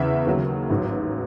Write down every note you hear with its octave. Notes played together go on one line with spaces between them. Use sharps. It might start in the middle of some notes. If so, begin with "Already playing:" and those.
Already playing: E2 C#3 E3 E5
D#2 C#3 F#3
A1 G#2 F#3